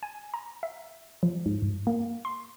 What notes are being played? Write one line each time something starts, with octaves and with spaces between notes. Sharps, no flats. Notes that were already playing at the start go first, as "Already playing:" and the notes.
G#5
A#5
E5
F3
G#2
G2
A#3
C6